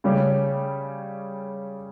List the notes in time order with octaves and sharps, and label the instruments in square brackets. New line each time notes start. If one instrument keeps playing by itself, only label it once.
[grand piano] C#3 G3 C#4 G4